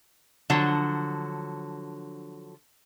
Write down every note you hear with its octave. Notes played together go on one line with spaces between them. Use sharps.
D3 F3 F#3